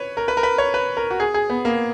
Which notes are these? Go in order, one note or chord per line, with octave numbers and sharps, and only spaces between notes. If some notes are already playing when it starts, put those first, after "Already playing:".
Already playing: B4 C#5
A#4
B4
A#4
B4
C#5
B4
A#4
F#4
G#4
G#4
B3
A#3